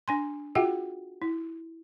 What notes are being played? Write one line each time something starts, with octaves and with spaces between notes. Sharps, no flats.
D4 G#5 C6
F4 F#4 G#4 E5 F#5 G5
E4